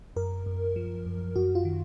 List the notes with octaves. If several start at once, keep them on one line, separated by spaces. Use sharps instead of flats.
F#2 A#4
F#2
F3
F#2
F#2 F#4
F4
D#3